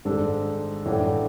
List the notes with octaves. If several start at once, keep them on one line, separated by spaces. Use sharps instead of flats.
G#1 G#2 G#3 D4 A4
A1 A2 E3 A3 D4